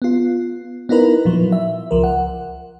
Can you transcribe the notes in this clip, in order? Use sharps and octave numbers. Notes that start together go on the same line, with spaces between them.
B3 F4
B3 D#4 E4 A#4 B4
A#2 F3 F#3
E5
C#2 F3 A#4
F#5